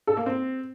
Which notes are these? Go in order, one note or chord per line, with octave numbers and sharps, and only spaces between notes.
A4
A#3
C4